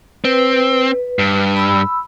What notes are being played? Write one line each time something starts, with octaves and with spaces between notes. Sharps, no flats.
C4 B4
G2
B5 E6